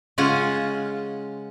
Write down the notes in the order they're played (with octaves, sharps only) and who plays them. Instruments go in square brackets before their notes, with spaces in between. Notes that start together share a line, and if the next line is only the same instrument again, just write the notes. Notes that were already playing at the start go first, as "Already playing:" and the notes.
[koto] C#3 G#3 C#4 F4 F#5